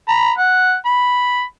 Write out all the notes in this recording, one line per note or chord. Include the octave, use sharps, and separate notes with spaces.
A#5 B5
F#5
B5